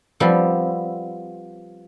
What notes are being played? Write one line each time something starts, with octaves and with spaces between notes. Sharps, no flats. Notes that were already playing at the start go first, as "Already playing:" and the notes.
F3 G3 B3 C4